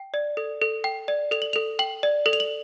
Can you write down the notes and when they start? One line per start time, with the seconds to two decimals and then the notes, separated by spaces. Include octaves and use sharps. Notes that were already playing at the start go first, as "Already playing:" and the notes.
Already playing: G5
0.14 D5
0.37 A4
0.62 A4
0.84 G5
1.08 D5
1.31 A4 F7
1.42 F#7
1.53 A4 F7
1.79 G5 F#7
2.03 D5
2.26 A4 F#7
2.33 F7
2.40 F#7